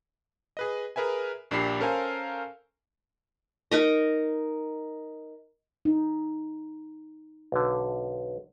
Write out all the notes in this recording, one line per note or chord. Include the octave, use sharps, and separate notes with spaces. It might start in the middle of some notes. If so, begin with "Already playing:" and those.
G#4 B4 D#5
G#4 A#4 B4 E5 G#5
A#1 A#2 D4 G4 B5 C7
C#4 A4 A#4 C5 F5 G#5
D#4 A#4 D#5
D#4
B1 D3